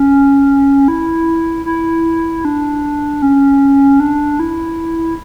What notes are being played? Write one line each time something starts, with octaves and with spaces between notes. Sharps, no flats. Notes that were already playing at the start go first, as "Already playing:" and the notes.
Already playing: C#4
E4
E4
D4
C#4
D4
E4